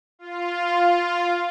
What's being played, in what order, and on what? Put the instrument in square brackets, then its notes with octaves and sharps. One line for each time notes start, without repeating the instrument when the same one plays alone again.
[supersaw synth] F4